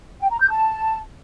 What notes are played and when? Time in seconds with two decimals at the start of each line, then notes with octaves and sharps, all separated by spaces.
0.20 G5
0.30 A#5
0.40 G6
0.51 A5